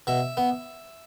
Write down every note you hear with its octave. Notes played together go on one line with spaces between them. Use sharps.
B2 E5
B3